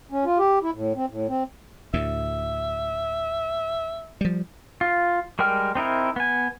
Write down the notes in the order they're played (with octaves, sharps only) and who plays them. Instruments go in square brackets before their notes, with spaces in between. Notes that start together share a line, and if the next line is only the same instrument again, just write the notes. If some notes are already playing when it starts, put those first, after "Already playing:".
[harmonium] C#4
F4
G4
E4
A2
C4
A2
C4
[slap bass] D2 A2 [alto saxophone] E5
[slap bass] F3 G3
[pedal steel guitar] F4
G3 G#3 A#4 G5 F6
C4 D#4 E4 A#4
B3 G#5